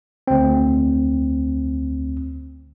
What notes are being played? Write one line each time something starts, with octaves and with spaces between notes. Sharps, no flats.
D2 C4